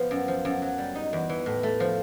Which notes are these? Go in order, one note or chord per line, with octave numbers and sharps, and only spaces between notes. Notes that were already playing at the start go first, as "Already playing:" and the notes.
Already playing: F3 B3
F#2
F3
F#2
F#3
G3
D#4
E2
E3
A2
A3
F3